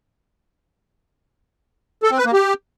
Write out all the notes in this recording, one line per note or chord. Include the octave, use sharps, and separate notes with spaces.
A4
C4
B4
A#3
G4